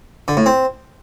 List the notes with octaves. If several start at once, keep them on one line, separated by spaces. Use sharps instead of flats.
D3
A2
C4